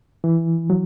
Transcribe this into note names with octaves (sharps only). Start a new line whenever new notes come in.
E3
F#3